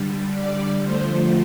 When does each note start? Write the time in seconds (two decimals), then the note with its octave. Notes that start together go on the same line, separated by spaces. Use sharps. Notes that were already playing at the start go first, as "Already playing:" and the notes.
Already playing: D3 G3
0.34 D5
0.83 D3 F3 A3 C5